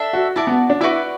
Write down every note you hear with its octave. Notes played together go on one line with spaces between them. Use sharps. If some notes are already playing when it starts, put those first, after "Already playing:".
Already playing: D4 A4 E5
F#4
E4 F#4 D5 A5
B3
D4
E4 F#4 B4 D5